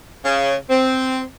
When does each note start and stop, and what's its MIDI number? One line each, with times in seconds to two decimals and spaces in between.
0.24 0.55 49
0.70 1.22 60